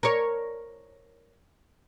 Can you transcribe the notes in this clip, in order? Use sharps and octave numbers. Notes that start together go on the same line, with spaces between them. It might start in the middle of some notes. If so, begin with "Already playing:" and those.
A#4 C#5